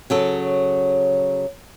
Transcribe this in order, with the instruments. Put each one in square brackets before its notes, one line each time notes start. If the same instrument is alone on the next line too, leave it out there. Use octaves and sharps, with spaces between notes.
[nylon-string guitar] C#3 F#3 A4